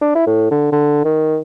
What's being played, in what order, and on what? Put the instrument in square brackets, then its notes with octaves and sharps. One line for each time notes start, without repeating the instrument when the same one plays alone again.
[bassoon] D4
E4
A2
D3
D3
D#3